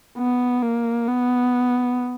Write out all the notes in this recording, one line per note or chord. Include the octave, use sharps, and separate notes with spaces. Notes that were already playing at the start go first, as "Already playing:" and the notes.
B3
A#3
B3